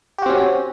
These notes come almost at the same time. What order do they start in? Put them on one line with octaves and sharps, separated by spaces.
G4 F#4 C4 C#4